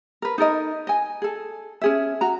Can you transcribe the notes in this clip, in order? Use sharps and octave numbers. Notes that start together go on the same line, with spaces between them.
A#4 B4
D#4 A4 A#4 D#5
D#5 G#5
G#4 A4
C#4 G#4 E5
F#4 A#5